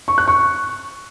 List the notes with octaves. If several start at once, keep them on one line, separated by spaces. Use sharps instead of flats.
C#6
F#6
C#6